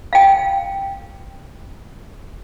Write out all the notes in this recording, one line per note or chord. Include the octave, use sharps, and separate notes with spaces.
F5 G5